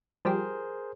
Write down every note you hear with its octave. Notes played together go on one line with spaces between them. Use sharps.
F3 G3 G4 G#4 A#4 C5